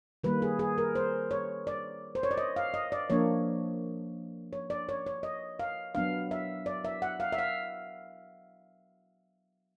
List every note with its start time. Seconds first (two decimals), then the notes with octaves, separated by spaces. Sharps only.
0.24 D#3 G3 A#3 B4
0.42 G#4
0.59 G#4
0.78 A#4
0.95 C5
1.31 C#5
1.67 D5
2.15 C5
2.23 C#5
2.31 D5
2.37 D#5
2.56 F5
2.74 D#5
2.92 D5
3.10 F3 A#3 D4 C#5
4.53 C#5
4.70 D5
4.89 C#5
5.06 C#5
5.23 D#5
5.59 F5
5.95 F#3 B3 D4 F5
6.31 E5
6.66 D5
6.85 E5
7.02 F#5
7.20 F5
7.32 E5
7.38 F5